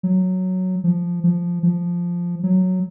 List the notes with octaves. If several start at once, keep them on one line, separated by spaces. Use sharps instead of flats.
F#3
F3
F3
F3
F#3